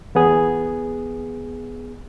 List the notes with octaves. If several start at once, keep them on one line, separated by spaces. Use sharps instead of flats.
E2 B3 G#4